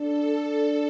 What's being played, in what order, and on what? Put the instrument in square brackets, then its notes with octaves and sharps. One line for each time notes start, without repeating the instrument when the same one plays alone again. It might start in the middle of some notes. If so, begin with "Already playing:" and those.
Already playing: [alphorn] D4 [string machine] A4
[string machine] A4